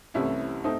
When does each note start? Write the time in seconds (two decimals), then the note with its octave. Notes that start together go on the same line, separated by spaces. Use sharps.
0.14 C2 C3 E3 A3 C#4 E4
0.64 A3 C4 D#4